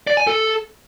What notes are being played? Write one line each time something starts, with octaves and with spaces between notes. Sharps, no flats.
D5
G#5
A4